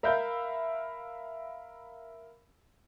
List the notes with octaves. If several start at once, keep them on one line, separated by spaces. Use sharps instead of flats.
A#4 E5 F5 B5 G6